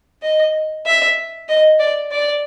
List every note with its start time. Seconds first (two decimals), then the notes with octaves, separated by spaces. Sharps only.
0.23 D#5
0.86 E5
1.49 D#5
1.79 D5
2.11 D5